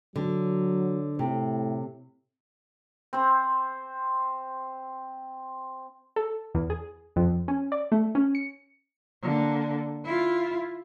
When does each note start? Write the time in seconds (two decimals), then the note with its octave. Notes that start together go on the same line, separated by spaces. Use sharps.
0.16 D3 F#3
1.19 A2 C3
3.13 C4 C5
6.16 A4
6.55 E2
6.70 G#4
7.16 F2
7.48 C#4
7.72 D5
7.92 A3
8.15 C#4
8.35 C#7
9.22 D3 A#3
10.05 E4 F4